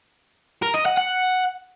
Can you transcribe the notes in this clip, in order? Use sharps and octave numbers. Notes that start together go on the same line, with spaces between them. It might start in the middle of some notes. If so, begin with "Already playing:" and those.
A#4
D#5
F#5
F#5